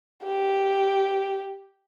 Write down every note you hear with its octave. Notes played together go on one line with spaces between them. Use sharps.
G4